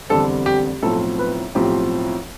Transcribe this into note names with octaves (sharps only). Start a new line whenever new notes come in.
F1 E2 D3 G3 C4 A4
G4
B1 A2 F3 C4 A4
B4
B1 A2 F3 C4 G4